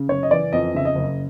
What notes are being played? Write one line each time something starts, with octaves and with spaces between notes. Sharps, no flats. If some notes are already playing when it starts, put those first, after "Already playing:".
Already playing: C#3
F#1 C#5
D#5
E3 D5
F2 D#5
C#3 E5
D#5
F#1